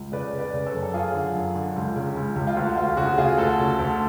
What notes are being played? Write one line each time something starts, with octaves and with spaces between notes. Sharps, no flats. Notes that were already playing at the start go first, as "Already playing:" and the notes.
Already playing: C#2
C#3 B4 D5
C#3
B4 D5
C#3
A4 C#5
F#2
A4
F#2 F4 G#4
D3
F#2
D3
C#2
C#3
C#2
C#2
F4
D2 F#4
D2 F4
C#3 F#4
C#3 F4 G#4
D2 F#4 A4
C#3
D2